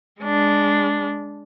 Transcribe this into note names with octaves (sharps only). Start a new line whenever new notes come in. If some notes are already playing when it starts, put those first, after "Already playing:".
G#3 D4